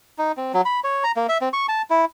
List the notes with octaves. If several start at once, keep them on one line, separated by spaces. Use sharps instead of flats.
D#4
C4
F#3
B5
C#5
A#5
A#3
E5
C4
C#6
A5
E4